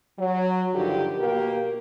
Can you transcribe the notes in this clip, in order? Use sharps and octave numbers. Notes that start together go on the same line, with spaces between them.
F#3
G2 D3 D#3 F3 G4
B2 A#3 G4 A#4